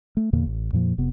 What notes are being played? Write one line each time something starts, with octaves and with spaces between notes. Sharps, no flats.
A3
E2 A#2 D3 A#3
A1
F2 A#2 F3 A#3
F1 C3 B3